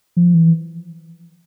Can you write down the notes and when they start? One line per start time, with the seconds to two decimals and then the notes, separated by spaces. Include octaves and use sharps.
0.17 F3
0.34 E3